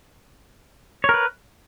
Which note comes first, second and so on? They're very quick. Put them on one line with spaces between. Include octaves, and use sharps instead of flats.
C#5 A#4 B4